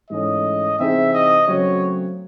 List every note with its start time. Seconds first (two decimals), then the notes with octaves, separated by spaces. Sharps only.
0.10 G#2 E3 A3 C#4 D#5
0.79 C3 E3 C4 D#4 G#4 E5
1.13 D#5
1.47 C#3 F#3 A3 C4 F#4 C#5